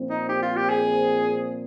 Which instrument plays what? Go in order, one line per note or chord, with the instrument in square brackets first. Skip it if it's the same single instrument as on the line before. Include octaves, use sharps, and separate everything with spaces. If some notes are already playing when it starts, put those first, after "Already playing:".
Already playing: [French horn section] A#2 F3 C4
[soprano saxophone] D#4
G4
F4
G4
G#4